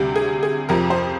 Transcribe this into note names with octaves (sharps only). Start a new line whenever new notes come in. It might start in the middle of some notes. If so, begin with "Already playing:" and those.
Already playing: D2 C3 G3
G#4
G#4
F2 C3 F3 A#4
C5